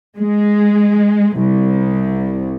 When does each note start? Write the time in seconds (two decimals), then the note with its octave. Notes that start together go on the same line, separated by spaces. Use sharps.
0.17 G#3
1.38 C2